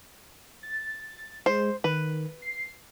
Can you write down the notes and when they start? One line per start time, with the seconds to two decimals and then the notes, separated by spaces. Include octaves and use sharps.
0.63 A6
1.46 G#3 C5
1.84 D#3 B4
2.42 C7